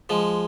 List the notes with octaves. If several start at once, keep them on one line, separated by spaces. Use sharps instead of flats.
F3 G#3